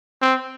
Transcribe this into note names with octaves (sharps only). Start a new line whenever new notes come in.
C4